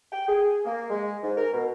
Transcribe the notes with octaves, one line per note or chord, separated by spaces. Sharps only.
G5
G#4
A#3
G#3
G#2
A#4
B2